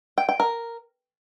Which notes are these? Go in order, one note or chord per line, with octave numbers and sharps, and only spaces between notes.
G5
G5
A#4